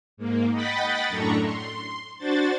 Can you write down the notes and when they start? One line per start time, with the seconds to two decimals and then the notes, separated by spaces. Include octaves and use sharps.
0.17 G#2 A#3
0.52 D#5 F#5 G5 B5 A6 B6
1.09 F#2 A2 D4 A4 A#5 C#6
1.41 C6
2.18 D4 F#4 C5 A6